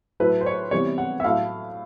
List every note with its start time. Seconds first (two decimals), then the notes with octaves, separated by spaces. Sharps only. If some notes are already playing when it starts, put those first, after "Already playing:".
0.20 A2 F#3 A3 B4
0.41 C5
0.46 C#5
0.71 C3 E3 G3 B3 C#5
0.98 F#5
1.20 E5
1.24 A2 F#3 A3 F5